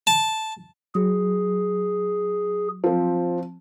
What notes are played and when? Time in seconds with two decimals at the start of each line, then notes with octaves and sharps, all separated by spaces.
0.07 A5
0.95 F#3 G#4
2.84 F3 C4